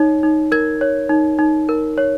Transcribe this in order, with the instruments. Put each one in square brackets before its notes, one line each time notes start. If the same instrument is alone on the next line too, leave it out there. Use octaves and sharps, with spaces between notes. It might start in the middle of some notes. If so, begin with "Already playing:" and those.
Already playing: [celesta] D#4 C#5
D#4
A#4 G#6
C#5
D#4
D#4
A#4
C#5